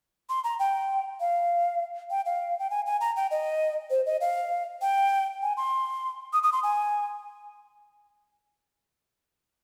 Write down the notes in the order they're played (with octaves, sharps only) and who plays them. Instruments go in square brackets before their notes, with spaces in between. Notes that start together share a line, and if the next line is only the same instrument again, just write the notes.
[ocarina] C6
A#5
G5
F5
G5
F5
G5
G#5
G#5
A#5
G5
D#5
C5
D#5
F5
G5
G#5
C6
D#6
D#6
C6
G#5